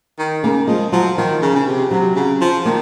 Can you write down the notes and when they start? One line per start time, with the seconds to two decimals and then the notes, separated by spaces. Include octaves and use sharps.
0.19 D#3
0.43 C#3 A#3
0.67 F3 G#3
0.92 F3 F#3
1.17 D#3 F3
1.42 C#3
1.55 C#3
1.67 C3
1.91 C3 F#3
2.16 C#3
2.41 F3
2.65 D#3 A#3